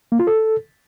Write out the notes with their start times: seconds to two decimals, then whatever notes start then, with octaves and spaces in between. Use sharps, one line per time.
0.12 A#3
0.20 F4
0.27 A4